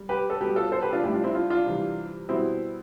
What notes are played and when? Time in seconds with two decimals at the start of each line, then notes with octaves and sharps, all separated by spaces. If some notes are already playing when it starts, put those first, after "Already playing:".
Already playing: G3
0.09 G4 B4
0.30 A4
0.41 B2 G3 G4 B4
0.56 F4 A4
0.72 A4 C5
0.82 G4 B4
0.93 D4 F4
1.03 A2 G3 E4 G4
1.14 D4 F4
1.24 C4 E4
1.35 D4 F4
1.50 D4 F4
1.66 C3 E3 G3
2.29 B2 G3 C4 E4